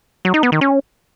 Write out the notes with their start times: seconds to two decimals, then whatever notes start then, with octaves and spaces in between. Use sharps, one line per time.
0.25 F#3
0.34 D#4
0.43 B3
0.52 D#3
0.61 C#4